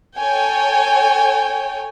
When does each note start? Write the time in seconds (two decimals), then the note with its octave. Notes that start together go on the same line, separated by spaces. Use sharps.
0.17 A4 C#5 G5 G#5